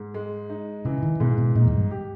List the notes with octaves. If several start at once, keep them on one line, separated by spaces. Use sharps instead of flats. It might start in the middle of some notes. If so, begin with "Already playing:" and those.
Already playing: G#2
G#3
D#4
C#3 E3
D#3
G#2 B2
B2
A#2 D#4
E2
G2
G4